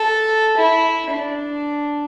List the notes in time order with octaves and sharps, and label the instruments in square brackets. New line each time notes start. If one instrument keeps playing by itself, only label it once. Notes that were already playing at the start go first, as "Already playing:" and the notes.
Already playing: [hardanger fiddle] A4
E4
D4